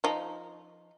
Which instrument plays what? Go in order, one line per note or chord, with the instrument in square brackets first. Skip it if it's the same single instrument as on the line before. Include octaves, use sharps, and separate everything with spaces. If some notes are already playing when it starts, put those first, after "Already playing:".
[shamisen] F3 D#4